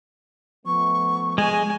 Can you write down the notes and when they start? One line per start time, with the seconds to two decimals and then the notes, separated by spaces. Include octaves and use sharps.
0.66 F3 A3 B3 C#6
1.38 G#3 G#5